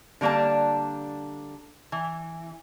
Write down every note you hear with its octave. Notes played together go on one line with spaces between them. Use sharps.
D3 G3 A#3 D4 A5
E3